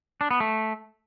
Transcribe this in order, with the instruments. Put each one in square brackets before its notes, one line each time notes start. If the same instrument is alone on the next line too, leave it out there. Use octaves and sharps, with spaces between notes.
[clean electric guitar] D4
B3
A3